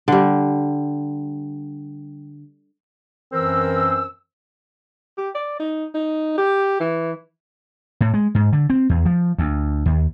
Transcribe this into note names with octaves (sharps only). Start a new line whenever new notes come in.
D3 G3
F#2 E3 C4 A#4 C5 E6
G4
D5
D#4
D#4
G4
E3
A2
G#3
G#2
D3
C4
E2
F3
D2
D#2